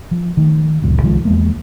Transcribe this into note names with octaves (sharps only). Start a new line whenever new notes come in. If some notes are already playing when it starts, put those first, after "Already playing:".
F3
D#3 A3
D1 C#2 F#2 A#2
C2 D#3 F3 G#3
E2 G#3 A#3